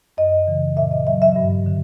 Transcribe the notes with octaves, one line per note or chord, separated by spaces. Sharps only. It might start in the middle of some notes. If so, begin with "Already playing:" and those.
F#2 D#5
C#3 E3
A#2 E5
D#5
F#3 E5
E5
G2
D3